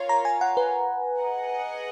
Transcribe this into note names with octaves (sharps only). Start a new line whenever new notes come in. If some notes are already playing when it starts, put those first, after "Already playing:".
Already playing: F4 A#4 C#5 F5
A#5
G#5
F#5
B4
G#4 D#5 F#5